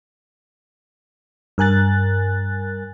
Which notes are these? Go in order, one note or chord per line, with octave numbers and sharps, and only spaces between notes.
G2 A#4 G#5 F#6 A6